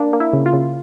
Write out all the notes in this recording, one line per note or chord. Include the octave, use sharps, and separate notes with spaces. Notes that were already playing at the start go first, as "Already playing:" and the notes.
Already playing: A#3 D4
A#3
E4
C#3
F4
C#3